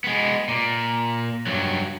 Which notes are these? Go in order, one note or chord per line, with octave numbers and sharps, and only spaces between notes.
G#3 B3
A#2
G2 F#3